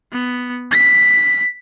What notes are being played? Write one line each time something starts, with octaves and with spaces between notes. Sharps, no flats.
B3
B6